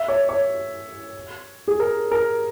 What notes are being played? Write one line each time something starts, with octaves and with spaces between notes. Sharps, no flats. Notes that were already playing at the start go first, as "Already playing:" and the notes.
Already playing: E5
C#5
C#5
G#4
A#4
A#4